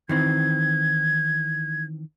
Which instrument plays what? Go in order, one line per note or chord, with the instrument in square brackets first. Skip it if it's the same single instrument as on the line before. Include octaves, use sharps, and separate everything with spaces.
[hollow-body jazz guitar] D#3 E3 C4 [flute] G#6